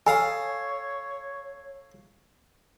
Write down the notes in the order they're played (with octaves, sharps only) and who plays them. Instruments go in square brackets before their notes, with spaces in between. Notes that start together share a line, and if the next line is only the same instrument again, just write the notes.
[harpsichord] A4 F5 D#6 [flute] C#5 [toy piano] G#5